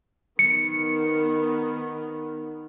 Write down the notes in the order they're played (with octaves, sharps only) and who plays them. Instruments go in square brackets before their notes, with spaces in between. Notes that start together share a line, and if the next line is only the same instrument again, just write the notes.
[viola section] D#3 B3 [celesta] C#7